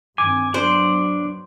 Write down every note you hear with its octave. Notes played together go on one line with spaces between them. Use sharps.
G2 D#3 C4 G#5 D6
F#3 B3 D4 C5 D5